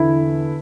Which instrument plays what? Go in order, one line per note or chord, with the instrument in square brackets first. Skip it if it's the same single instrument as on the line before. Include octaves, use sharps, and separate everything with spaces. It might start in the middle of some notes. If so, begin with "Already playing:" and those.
Already playing: [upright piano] E2 D3 E4